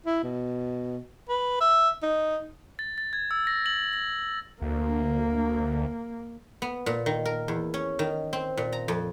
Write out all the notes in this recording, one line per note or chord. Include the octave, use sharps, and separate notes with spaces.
E4
B2
B4
E5
D#4
A6
A6
G#6
E6
A#6
F#7
A#6
D2 A#3
B3
A#2
D#3
A#4
E2
C#4
D#3
C4
A#2
A#5
F2